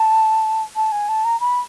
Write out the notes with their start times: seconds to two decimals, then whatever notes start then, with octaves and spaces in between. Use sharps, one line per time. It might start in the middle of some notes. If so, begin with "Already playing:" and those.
Already playing: A5
0.76 A5
0.92 G#5
1.09 A5
1.25 A#5
1.40 B5